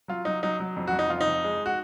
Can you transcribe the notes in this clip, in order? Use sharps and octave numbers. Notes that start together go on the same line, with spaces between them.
F#3 F4
F#3 D#4
F#3 D#4
F#3
F2
F#4
F2
D#4
F2 F4
D#4
F2
G#3
F#4